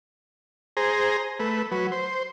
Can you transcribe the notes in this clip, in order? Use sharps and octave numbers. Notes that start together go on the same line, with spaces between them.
G#4 C5 A#5
A3 B4
F#3 B4
C5